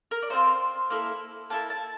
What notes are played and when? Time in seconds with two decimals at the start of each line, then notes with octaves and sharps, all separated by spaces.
0.11 A#4
0.22 D5
0.30 A3 C4 F4 C5
0.90 A#3 E4 A4
1.50 A#3 E4 A4 A5
1.70 A5